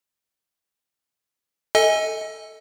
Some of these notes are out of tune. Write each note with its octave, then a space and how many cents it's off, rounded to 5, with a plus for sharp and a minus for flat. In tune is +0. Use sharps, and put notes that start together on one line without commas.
A4 +10 D#5 +30 G#5 -10